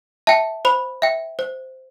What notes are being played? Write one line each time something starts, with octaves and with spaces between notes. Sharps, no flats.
E5 G5 A5
C5 B5
E5 G5
C5